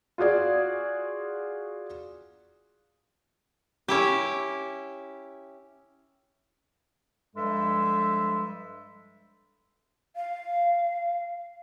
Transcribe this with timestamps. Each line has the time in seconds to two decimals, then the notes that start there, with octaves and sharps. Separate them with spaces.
0.18 F4 F#4 G#4 D5
3.88 C#4 E4 G4
7.36 G2 F3 G3 G#3 A4 E5
10.16 F5